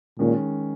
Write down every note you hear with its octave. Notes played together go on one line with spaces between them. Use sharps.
A#2 D#3 G#3 C#4